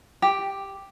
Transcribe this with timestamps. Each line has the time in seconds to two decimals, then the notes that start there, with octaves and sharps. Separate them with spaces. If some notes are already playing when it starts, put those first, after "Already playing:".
0.22 G4